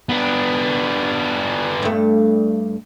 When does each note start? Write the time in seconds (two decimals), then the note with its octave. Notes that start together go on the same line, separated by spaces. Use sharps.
0.09 B3 D4
1.82 G2 A3